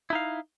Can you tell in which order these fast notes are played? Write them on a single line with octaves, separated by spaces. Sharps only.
E4 D#4 F5